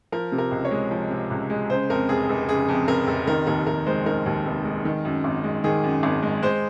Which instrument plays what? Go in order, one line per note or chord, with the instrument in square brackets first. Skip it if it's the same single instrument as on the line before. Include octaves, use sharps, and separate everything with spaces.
[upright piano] F3 A#4
C3
A#4
C#2
C#5
G#3
F3
C3
C#2
G#3
C#3 C5
F2 A#4
F1 G#4
F1
C#3 G#4
F2
F1 A#4
F1
D#3 A#4
D#2 A#4
F1 A#4
G#3 C5
D#3 A#4
D#2
F1
G#3
D#3
F#2
G#1
G#3
D#3 G#4
F#2
G#1
G#3
G#3 C5